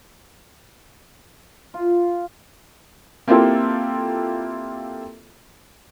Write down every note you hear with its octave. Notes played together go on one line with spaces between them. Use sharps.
F4
A#3 C4 E4 F4 G4 A4